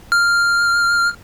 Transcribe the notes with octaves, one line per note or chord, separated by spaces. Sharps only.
F6